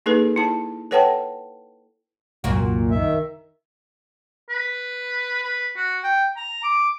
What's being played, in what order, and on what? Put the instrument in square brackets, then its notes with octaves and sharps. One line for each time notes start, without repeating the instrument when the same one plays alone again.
[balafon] A#3 D#4 G#4 A4 B4
E4 A5
A4 B4 C#5 F#5 G5 A5
[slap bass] C2 F#2 F#3 [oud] A#2 A#3 F#4
[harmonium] D#3 E5
[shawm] B4
B4
F#4
G5
A#5
D6